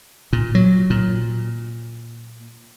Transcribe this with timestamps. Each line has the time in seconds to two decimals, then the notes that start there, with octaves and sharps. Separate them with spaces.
0.33 A#2
0.55 F#3
0.90 A#2